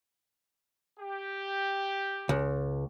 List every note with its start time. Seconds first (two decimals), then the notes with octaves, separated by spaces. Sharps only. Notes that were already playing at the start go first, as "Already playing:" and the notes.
0.98 G4
2.29 C#2